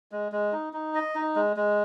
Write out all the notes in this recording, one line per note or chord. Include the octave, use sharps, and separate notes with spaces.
G#3
G#3
D#4
D#4
D#5
D#4
G#3
G#3